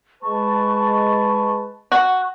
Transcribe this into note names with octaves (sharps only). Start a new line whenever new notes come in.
G#3 B4 A5 C#6
F#4